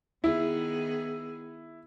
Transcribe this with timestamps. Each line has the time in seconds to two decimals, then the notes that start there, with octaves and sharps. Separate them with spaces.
0.24 D#3 B3 E4 G#4